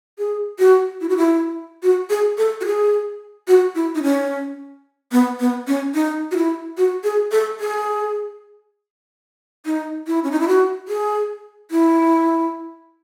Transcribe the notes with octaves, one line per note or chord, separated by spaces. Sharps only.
G#4
F#4
E4
F#4
E4
F#4
G#4
A4
F#4
G#4
F#4
E4
D#4
C#4
B3
B3
C#4
D#4
F#4
E4
F#4
G#4
A4
G#4
D#4
E4
C#4
D#4
E4
F#4
G#4
E4